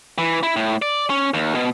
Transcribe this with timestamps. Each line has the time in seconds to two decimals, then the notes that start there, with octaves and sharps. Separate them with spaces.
0.18 E3
0.43 E4
0.56 A2
0.82 D5
1.10 C#4
1.34 D#2
1.55 B2